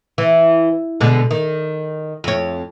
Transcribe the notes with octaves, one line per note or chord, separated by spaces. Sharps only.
E3
B2 D3 G#3
D#3
F2 C#5